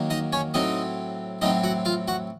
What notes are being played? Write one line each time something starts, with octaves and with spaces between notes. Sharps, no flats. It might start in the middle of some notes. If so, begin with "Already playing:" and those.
Already playing: D#3 F#3 A#3
D#4 D#5
C#4 C#5
A2 F#3 C4 D#4 D#5
A2 F#3 C4 D#4 D#5
F#4 F#5
F4 F5
F#4 F#5